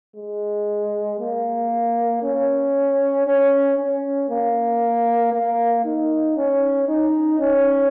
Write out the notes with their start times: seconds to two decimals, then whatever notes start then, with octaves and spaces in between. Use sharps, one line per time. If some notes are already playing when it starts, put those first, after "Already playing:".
0.16 G#3
1.20 A#3
2.23 C#4
3.27 C#4
3.78 C#4
4.29 A#3
5.33 A#3
5.84 D#4
6.36 C#4
6.88 D#4
7.39 C#4